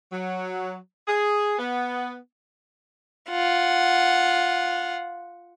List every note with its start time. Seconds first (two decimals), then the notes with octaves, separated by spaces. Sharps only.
0.12 F#3
1.08 G#4
1.59 B3
3.30 F4 F#5